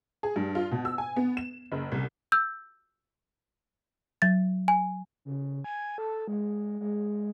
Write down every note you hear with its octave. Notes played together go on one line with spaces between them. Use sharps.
G#4
G2
F4
B2
E6
G#5
B3
E7
F#1
C2
E6 G6
F#3 A6
G#5
C#3
G#5
A4
G#3
G#3